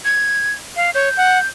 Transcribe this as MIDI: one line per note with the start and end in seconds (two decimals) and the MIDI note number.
0.05 0.53 92
0.76 0.91 77
0.95 1.09 73
0.95 1.47 91
1.17 1.39 78